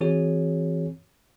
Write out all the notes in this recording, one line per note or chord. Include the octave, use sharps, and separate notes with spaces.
E3 C4 F#4 G#4 C#5